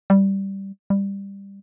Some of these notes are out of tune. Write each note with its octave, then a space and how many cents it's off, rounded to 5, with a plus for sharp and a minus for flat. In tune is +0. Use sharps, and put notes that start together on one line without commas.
G3 -5
G3 +15